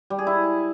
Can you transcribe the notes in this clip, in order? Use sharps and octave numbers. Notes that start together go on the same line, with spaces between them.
G3
G#4
E4